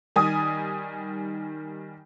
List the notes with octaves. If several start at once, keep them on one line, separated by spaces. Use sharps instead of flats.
D#3 G3 G#5 D#6